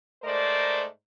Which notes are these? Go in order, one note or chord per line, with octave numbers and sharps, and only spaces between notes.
G#2 A3 A#4 C5 D5